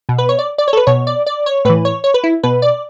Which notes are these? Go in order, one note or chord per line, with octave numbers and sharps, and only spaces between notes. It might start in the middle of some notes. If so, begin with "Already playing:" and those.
B2
B4
C#5
D5
D5
C#5
A4
B4
B2 C#5
D5
D5
C#5
A2 E3 B4
C#5
C#5
B4
E4
B2 B4
D5